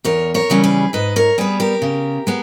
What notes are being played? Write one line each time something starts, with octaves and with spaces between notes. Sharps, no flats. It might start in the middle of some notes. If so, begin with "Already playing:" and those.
E2 A#4 C#5
A#4 C#5
C#3 E3 G3 C#4
G#4 B4
G#2 B4 D#5
A#4 C#5
G3 B3 G#4 B4
G4 A#4
C#3
G#3 B3